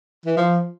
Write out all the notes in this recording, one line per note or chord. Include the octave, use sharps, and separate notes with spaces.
E3
F3